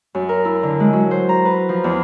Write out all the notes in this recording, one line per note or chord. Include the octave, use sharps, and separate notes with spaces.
F#2
A#4
E4
D3
G#3
F#3
C5
A#5
B4
F3
E2